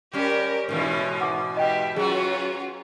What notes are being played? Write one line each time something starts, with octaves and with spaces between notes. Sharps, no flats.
G3 C#4 G4 A#4
G#2 B2 E3 C#4
F#5 D6
G4 D#5 E5 G5
F#3 C#4 F4 F#4 G#4